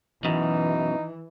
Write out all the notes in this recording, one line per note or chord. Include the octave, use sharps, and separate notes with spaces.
F#2 B2 E3 D#4